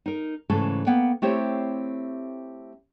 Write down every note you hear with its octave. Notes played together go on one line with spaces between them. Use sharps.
D#4 A#4
G#2 C#3 E3 A3 A4 A5
A#3 B3 F#5 G5
A3 C4 E4 G4 C5 C#5